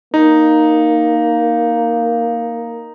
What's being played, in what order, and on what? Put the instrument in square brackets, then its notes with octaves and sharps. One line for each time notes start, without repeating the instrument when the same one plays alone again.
[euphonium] A#3 [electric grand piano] D#4